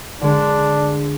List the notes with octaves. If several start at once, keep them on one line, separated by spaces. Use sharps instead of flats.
D3 G#3 D4